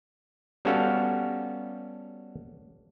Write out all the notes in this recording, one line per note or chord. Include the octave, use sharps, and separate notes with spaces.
G3 B3 C#4 F#4 A4 F5